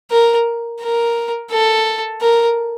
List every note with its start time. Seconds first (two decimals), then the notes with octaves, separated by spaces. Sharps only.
0.11 A#4
0.81 A#4
1.51 A4
2.21 A#4